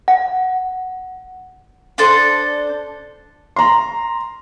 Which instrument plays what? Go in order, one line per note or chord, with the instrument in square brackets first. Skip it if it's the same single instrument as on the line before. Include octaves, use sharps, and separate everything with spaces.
[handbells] F#5
[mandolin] D4 A4 C5
[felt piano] A#5 C6